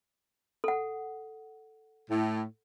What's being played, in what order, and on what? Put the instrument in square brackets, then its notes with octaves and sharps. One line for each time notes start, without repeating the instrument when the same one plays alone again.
[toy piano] A4 F#5
[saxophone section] A2